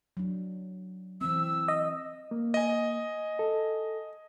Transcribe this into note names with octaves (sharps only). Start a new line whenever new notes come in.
F#3 D4
E3 C4 E6
D#5
A#3
D#5 G#5
A4